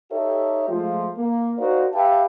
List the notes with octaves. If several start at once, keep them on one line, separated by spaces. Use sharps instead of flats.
D#4 G4 A4 C#5 D#5 E5
F3 G#3 A3 F4
A#3
D#4 F#4 A#4 C5 D5 F5
G4 B4 E5 F5 G5 A5